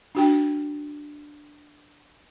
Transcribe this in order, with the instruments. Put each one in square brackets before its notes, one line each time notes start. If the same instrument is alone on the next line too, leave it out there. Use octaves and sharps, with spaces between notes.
[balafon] D4 F#4 G5